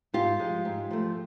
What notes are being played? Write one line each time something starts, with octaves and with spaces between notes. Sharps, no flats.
G#2 F4 G4
F3 G#3
G#2
F3 A3